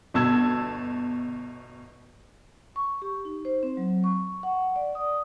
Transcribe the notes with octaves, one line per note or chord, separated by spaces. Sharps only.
G1 B2 A5 E6 G#6
C#6
G4
D#4
C5
C4
F#3
C#6
F#5
D5
D#6